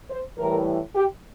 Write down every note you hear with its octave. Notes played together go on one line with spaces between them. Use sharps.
C5
A2 E3 G3 A#4
G4